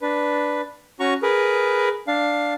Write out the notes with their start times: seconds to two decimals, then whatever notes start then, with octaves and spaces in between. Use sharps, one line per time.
0.01 D4 B4
1.00 C#4 F#4 A#5 C#6
1.23 G#4 A#4 B4
2.08 D4 F5